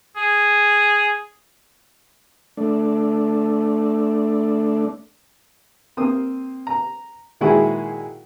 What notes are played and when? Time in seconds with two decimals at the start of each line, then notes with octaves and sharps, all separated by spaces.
0.16 G#4
2.57 A3 D4
5.97 A#3 C4 D#6
6.67 A#5
7.41 A#2 D#3 G#3 E4 F#4 G#4